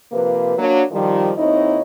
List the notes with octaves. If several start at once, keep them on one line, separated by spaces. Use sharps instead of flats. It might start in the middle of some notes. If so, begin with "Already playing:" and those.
C3 F3 A#3 B4
F#3 A#3 D4
D#3 F3 G3
D#2 C4 D#4 E4 C#5 D#5